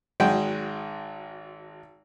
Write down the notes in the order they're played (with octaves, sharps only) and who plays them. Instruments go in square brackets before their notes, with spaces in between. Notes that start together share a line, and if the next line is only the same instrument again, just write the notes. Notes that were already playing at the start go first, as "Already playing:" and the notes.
[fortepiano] G#1 G#3 F#4 G5